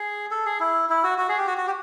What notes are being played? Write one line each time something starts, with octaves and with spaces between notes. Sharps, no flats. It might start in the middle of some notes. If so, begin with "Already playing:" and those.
Already playing: G#4
A4
G#4
E4
E4
F#4
F#4
G#4
G4
F#4
F#4
G4